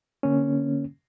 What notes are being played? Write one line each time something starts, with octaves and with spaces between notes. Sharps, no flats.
D3 A#3 C#4